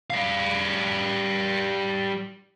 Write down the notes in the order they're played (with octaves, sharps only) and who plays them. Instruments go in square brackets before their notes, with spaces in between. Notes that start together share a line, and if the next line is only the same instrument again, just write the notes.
[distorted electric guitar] G3 F5